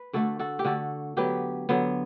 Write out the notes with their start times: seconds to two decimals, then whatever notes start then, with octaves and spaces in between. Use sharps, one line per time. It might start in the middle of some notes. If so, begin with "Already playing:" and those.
Already playing: B4
0.13 D3 A3 F#4 A4
0.39 F#4 A4
0.59 G4
0.65 D3 A3 F#4 A4
1.17 D3 F#3 B3 G4 B4
1.69 D3 F#3 B3